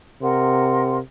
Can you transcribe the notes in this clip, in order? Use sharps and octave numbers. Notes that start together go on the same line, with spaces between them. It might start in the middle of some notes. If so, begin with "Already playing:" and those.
C3 A#4 F#5 C6